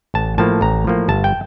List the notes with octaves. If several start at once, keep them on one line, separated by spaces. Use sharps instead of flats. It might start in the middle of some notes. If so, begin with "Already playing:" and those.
A1 A5
A2 F3 A#3 A5
A1 A#5
A2 F3 A#3
G1 A5
G5